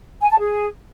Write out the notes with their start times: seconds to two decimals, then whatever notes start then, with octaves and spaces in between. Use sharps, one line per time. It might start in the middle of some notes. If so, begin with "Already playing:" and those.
0.21 G#5
0.30 A5
0.39 G#4